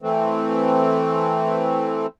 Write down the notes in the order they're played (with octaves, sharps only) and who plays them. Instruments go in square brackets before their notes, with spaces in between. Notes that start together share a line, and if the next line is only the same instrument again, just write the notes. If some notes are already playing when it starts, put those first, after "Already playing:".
[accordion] E3 A3 C4